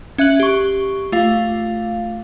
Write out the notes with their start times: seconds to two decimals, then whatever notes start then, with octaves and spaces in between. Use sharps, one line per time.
0.18 C#4 E5 F#6 F#7
0.40 G4 C#6
1.12 A3 F4 F5